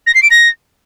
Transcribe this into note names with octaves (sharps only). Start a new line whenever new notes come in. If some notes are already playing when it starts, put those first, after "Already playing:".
A#6
C7
D7
A#6